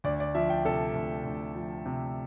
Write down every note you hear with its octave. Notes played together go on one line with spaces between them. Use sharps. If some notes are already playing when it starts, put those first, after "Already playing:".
D2 D5
D5
F3 E5
G5
C3 A4
D2
D2
F3
C3